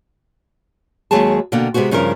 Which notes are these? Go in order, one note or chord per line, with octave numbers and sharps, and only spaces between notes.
D#2 F#3 G#3 G#4 A5
B2 D3 A#3 F#5 G5
C3 G#3 B3 C4 F#4
G2 C#3 F3 E4 A#4